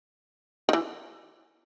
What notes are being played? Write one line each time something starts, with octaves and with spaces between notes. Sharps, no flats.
D#3
E3